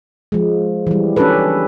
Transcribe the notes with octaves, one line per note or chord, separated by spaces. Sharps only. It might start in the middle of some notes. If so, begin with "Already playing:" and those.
F3 G#3
E3 G3
C#4 D4 G4 A4 B4